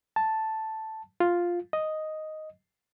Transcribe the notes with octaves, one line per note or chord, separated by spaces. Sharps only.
A5
F4
D#5